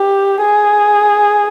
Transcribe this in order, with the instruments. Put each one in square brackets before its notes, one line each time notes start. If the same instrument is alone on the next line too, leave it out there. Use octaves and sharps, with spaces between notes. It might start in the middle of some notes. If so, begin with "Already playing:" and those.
Already playing: [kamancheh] G4
G#4